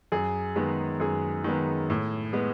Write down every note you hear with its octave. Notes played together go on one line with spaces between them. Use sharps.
F#2 G#4
D#3 G#3 B3
F#2 G#4
D#3 G#3 B3
A2
G#3 B3